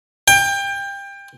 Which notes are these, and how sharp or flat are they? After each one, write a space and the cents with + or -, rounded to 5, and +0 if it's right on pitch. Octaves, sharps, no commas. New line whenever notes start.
G5 +25